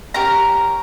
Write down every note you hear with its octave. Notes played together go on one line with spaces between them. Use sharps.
C#4 G4 A#4 A#5